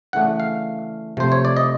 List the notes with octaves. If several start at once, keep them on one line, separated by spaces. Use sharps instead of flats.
C#3 E3 A3 D4 F#5
F5
C3 F3 A3 C5
C#5
D5
D#5